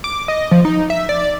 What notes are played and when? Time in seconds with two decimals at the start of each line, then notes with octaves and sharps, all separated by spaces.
0.04 D6
0.28 D#5
0.51 F3
0.65 D#4
0.90 E5
1.09 D5